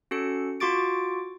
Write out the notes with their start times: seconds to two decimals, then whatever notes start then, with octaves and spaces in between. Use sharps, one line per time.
0.11 C#4 F#4 A4 C#7
0.60 F4 F#4 C#6 D6 A6 D7